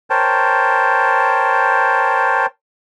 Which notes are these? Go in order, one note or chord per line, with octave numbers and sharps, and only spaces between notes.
A#4 C5 C#5 G5 A5